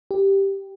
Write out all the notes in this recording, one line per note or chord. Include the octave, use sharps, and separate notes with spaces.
G4